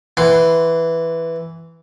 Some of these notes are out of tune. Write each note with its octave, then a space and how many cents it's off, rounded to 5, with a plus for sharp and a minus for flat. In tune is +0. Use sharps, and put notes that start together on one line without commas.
E3 +0 F#5 +20 C6 -15